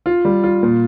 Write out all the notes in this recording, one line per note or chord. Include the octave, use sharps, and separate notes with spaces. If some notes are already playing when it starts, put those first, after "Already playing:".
F4
G3
F4
A#2